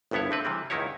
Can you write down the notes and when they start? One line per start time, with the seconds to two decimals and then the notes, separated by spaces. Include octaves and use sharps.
0.11 G1 C2 G2 B3 E4 C#5
0.31 D3 C4 B4
0.45 C3 E3 G3 C4
0.70 C#2 F#2 D#3 D#4 E4 C#5